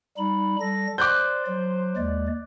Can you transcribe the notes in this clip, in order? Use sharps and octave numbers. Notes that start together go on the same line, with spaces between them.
G3 D#4 B5
G3 A4 A#6
C5 D5 D6 F#6 G6
F#3
D#2 G#3 D5